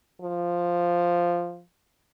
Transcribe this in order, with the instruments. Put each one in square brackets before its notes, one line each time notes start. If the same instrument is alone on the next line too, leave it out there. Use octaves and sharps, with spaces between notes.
[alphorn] F3